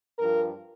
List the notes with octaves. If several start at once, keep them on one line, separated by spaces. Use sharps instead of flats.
G2 F3 A#4